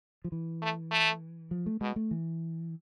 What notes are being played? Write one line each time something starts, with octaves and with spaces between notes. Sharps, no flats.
F3
E3
A3
A3
F3
A3
B2 G#3
A3
E3